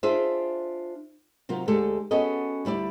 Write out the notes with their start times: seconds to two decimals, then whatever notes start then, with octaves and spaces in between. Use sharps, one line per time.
0.03 D4 F4 G#4 C5 E5
1.49 C3 F#3 F4 A#4
1.68 D2 G#3 G4 A4
2.11 B3 C#4 F#4 G#4 A4 D#5
2.65 D2 G3 E4 D5